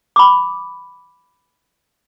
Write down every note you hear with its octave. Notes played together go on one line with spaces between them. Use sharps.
B5 D6